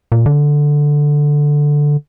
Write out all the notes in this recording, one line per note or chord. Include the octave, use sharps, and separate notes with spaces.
A#2
D3